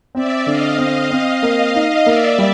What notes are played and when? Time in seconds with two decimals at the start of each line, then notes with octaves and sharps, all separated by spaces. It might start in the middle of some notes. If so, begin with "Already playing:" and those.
0.14 C4 D5 E5
0.46 D3 D#5 F5
0.78 C4 D#5 F5
1.11 C4
1.43 A#3
1.75 D#4
2.06 A#3 D5 E5
2.38 G3